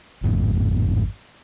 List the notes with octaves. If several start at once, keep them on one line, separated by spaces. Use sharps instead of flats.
G#1 F2 A2